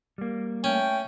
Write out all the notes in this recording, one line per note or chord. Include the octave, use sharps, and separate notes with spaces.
G3 A#3
A3 C#4 G5